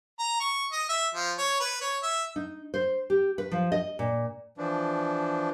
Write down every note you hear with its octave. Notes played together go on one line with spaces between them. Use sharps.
A#5
C#6
D#5
E5
F3
C#5
B4
C#5
E5
D#4
C5
G4
B4
F3
D#5
A#2
E3 F3 D4